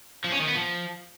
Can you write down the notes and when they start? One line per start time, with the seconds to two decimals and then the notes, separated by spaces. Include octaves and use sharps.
0.24 F3
0.32 C#4
0.40 D#3
0.48 B3
0.55 F3